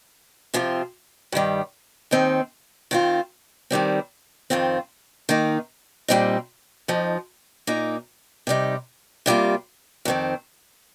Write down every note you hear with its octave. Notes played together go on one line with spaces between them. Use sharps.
C3 F3 C4 F4
G2 D#3 G3
D#2 D#3 C4 D#4
D#3 C4 F4
G2 D#3 G3 C4
F2 D#3 C4 F4
D#3 A#3 D#4
A#2 G3 C4 D#4
F2 F3 D#4
A#2 A#3 D#4
C3 G3 D#4
C3 G3 A#3 F4
F2 D#3 C4